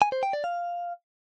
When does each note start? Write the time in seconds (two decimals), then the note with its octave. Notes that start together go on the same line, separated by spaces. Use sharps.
0.02 G#5
0.12 C5
0.23 G5
0.33 D5
0.44 F5